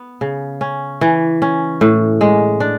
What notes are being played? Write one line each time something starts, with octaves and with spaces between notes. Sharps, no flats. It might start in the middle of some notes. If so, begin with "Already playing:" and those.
Already playing: B3
C#3
C#4
E3
C#4
A2
G#3
D4